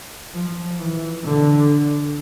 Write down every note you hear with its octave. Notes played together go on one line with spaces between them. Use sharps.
F3
E3
D3